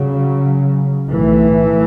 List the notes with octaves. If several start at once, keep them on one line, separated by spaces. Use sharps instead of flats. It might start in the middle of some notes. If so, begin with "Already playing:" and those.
Already playing: C#3 F#3
B1 A2 E3 A3